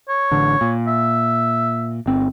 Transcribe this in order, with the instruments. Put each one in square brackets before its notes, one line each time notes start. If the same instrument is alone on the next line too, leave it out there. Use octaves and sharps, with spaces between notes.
[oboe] C#5
[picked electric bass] A1 D3
A#2
[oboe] E5
[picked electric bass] G1 C4